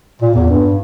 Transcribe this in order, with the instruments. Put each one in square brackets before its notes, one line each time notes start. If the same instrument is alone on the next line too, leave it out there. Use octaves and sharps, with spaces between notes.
[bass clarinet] A#2
E2
G2